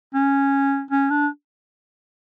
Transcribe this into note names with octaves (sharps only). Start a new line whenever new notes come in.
C#4
C#4
D4